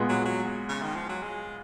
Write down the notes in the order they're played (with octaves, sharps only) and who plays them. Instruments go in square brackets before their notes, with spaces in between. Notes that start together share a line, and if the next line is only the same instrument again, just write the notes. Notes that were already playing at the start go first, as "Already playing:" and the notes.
Already playing: [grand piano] A#2 G#3 B3
[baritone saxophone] F#3
F#3
C#3
D#3
F3
F#3
G#3